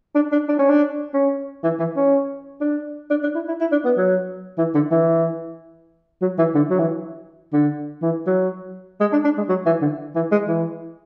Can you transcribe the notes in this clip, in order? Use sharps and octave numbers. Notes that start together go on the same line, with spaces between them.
D4
D4
D4
C#4
D4
C#4
E3
E3
C#4
D4
D4
D4
E4
E4
E4
D4
B3
F#3
E3
D3
E3
F#3
E3
D3
F#3
E3
D3
E3
F#3
G#3
D4
D4
G#3
F#3
E3
D3
E3
G#3
E3